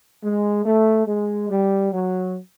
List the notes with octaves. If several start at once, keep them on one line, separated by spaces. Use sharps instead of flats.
G#3
A3
G#3
G3
F#3